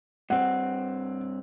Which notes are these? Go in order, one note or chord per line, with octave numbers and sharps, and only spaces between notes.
G2 C4 F#5